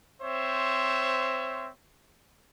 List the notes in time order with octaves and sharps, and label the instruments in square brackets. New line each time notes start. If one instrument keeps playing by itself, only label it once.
[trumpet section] C4 C5 C#5 E5